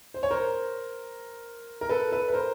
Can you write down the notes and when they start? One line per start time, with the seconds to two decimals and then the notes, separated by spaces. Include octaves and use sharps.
0.14 C5
0.23 C#5
0.31 A#4 C5
1.81 A#4
1.89 A4 B4
2.12 A4 B4
2.28 B4
2.33 A#4 C5